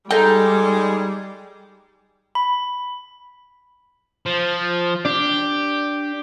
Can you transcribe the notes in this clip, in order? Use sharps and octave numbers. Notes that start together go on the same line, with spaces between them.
G3 G#3 D#4 A4 G5
B5
F3
D4 G4 D5